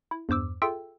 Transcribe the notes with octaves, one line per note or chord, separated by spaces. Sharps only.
E4
E2 G2 C5 D6 E6
F4 G#4 A4 E5 G5 E6